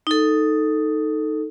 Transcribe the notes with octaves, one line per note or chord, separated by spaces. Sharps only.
D#4 A4